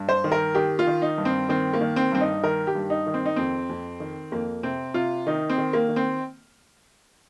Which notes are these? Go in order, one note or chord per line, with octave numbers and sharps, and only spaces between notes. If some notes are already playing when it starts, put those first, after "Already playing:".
Already playing: G2
C5
D#3
A#4
D#3 G4
F4
D#3
D#4
G2
C4
D#3 C4
A#3
D#3
C4
G2 C4
D#4
D#3 A#4
G4
G2
D#4
D#3
C4
D#4
F2 C4
F2
D#3
F2 A#3
C3 C4
C3 F4
D#3 D#4
C4
D#3
A#3
D#3
C4